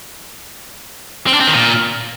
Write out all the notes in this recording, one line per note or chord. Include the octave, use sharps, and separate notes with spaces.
C4
D4
C4
D#3
A#2